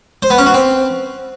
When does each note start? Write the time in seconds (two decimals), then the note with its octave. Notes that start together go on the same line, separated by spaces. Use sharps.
0.23 C5
0.30 B3
0.38 C#4
0.46 F#4
0.54 C4